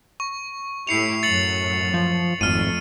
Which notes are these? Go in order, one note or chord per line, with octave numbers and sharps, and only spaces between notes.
C#6
A2 E4 G4 C7 C#7 F7
F#2 A2 F#3 A6 C#7 F#7
F3
G#1 F2 A3 F6 D#7